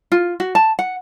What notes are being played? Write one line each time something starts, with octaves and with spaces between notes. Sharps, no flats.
F4
F#4
A5
F#5